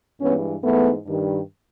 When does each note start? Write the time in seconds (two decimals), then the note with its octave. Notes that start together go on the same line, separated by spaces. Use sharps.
0.21 G2 E3 G#3 B3 C#4
0.64 G#2 E3 G#3 A3 B3
1.06 G2 D#3 G3